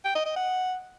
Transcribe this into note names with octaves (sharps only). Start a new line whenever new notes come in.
G5
D#5
D#5
F#5